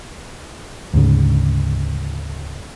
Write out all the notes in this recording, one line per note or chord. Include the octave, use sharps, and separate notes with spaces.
D2 G#2 C#3